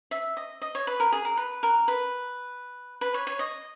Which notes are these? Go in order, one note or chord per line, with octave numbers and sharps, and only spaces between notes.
E5
D#5
D#5
C#5
B4
A#4
G#4
A#4
B4
A#4
B4
B4
C#5
C#5
D#5